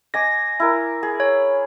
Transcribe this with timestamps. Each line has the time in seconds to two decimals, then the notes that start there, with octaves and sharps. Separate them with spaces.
0.14 D#5 G#5 D6 A#6
0.60 E4 A#4
1.03 G#4
1.20 C#5